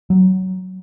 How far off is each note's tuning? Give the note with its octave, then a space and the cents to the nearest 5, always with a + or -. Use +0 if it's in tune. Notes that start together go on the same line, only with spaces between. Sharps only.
F#3 +15